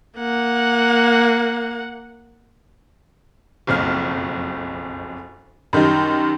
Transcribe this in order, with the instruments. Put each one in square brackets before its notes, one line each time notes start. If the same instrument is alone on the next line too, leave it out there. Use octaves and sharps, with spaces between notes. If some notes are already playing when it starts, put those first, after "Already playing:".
[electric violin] A#3 F#5
[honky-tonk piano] F#1 B1 F2 F6
F#2 D#3 G3 D#4